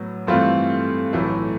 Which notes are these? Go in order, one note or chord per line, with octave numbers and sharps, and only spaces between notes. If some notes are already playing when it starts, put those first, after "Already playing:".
Already playing: A2 F#3 B3
G2 E3 A3 C4 F4
B1 A2 E3 A3